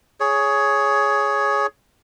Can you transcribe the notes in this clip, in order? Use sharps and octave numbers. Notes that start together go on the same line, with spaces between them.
G#4 C#5